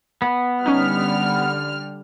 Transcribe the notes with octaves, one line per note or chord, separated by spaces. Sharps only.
B3
D3 G3 C#4 D#4 F6